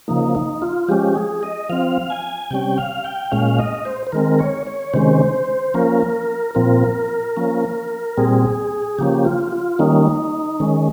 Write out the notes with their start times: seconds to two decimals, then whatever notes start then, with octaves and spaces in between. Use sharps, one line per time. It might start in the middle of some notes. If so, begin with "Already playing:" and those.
0.08 C#3 F3 A#3 D#4
0.35 D#4
0.62 F4
0.88 F3 G#3 C#4 G4
1.16 G#4
1.43 D#5
1.69 F3 C4 F5
2.10 G#5
2.51 C3 G3 C#4 G5
2.78 F5
3.04 G5
3.31 A#2 G#3 C#4 F5
3.59 D#5
3.85 C5
4.07 C5
4.12 D#3 G#3 C4 A#4
4.39 C#5
4.67 C#5
4.94 C3 D#3 G#3 C#4 C5
5.74 F3 A#3 C#4 A#4
6.55 A#2 F3 C4 A#4
7.37 F3 A#3 C#4
8.17 A#2 G3 C4 G#4
8.98 C#3 F3 A#3 C#4 G4
9.25 F4
9.52 F4
9.79 D#3 G3 A#3 C#4 D#4
10.60 D#3 G#3 C#4